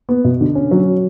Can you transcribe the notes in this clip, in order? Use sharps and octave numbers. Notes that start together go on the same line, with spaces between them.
B3
B2
D3
C#4
F#3